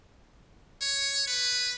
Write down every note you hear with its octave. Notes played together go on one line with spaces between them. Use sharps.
C#5
B4